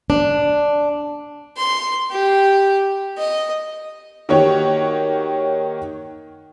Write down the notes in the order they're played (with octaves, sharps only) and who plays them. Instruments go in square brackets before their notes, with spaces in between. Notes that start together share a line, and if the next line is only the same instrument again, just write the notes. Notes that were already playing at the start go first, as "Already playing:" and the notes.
[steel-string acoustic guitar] D4
[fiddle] C6
G4
D#5
[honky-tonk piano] D#3 A#3 F#4 G4 C#5